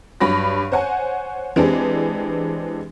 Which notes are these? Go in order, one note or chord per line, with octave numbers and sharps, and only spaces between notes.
G2 F#3 C#5 B5 A#6
C5 C#5 F#5 G#5
E3 G#3 C4 D4 G4 G#4